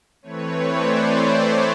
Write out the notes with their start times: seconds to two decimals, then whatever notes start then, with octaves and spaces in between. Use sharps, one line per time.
0.22 E3 A3 C4 B4 C#5
0.67 C5 D5